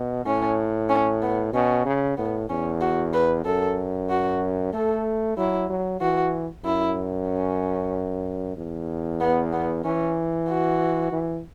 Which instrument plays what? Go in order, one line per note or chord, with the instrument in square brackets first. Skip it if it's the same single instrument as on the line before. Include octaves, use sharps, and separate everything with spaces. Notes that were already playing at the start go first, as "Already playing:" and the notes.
Already playing: [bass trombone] B2
[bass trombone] A2 [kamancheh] C#4
[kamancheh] C#4
B3
[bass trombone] B2 [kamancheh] C#4
[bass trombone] C#3
[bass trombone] A2 [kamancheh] B3
[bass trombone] E2 [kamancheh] C#4
[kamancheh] F#4
B4
[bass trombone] F#2 [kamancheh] A4
[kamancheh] F#4
[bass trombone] A3 [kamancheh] A4
[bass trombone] F#3 [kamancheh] E4
[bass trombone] F#3
[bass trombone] E3 [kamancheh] F#4
[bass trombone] F#2 [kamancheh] E4
[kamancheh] C#4
[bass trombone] E2
[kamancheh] B3
B3
[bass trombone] E3 [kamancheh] C#4
[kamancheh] F#4
[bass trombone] E3